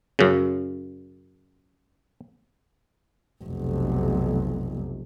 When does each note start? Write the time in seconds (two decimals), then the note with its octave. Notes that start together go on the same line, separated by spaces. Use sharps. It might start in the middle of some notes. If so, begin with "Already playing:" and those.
0.19 F#2 C#3
3.44 F1 B1